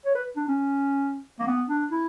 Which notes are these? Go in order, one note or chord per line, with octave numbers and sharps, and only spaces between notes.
C#5
B4
D4
C#4
A#3
B3
D4
E4